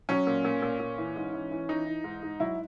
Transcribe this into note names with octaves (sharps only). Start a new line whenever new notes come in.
F#3 C#4
A#2
A#2
A#2
A#2
E3
G#2
E3
E3
E3 D#4
E3
G#2
G#2
F#3 E4